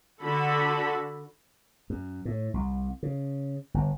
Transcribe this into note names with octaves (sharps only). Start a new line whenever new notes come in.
D3 F#4 A4 B5
F#2
A2
C2
C#3
G1